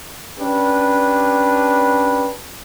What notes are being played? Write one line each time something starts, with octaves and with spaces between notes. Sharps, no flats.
C#4 D4 G4 B4